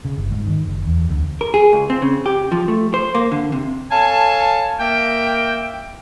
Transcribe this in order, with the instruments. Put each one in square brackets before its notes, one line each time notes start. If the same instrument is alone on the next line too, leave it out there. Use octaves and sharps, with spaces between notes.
[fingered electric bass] C#3
G1
G#2
D#3
F#1
E2
D2
[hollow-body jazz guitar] A#4
G#4
C#2
C4
C#3
G4
F3
A3
C5
A#3
D3
C3
[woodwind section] A4 C#5 F5 G#5 A5
A#3 A#4 E5 G5